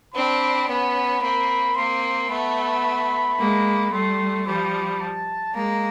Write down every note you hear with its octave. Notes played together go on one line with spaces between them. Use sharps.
C4 D4 B5
B3 C#4 B5
A#3 C4 B5
A#3 C4 C6
A3 B3 B5
G#3 A#3
G3 A3 C6
F3 G3 B5
A5
G#3 A#3 A#5